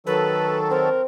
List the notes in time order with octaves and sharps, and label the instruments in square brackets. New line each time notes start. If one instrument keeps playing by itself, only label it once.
[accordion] D#3 F#3 A4 [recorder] B4
[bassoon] C4 [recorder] A#4